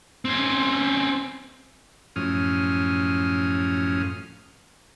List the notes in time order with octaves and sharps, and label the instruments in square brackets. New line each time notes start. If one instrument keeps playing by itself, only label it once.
[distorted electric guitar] C4 C#4
[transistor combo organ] F#2 A2 F3 C#4 D#6 F6